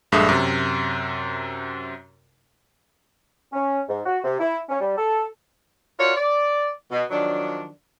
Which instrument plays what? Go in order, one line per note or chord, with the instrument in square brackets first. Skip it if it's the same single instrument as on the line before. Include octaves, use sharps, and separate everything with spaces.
[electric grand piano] A#1 G2 G#3 A4 E5 D#6
F#2 C3
[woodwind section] C#4
G#2
F#4
C3
E4
C#4
G3
A4
[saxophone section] F4 F#4 A#4 C#5 D5
D5
B2
D#3 F3 F#3 D4